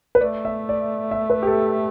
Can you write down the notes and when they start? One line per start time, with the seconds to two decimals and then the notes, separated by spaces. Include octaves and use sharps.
0.15 B4
0.20 A3 D5
0.45 E5
0.69 D5
1.11 E5
1.30 B4
1.43 G4
1.47 A4